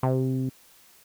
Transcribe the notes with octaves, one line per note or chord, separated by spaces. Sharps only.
C3